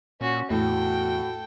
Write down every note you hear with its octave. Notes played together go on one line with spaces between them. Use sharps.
A#2 C#4 F#4
E2 A2 F#4 A4 G5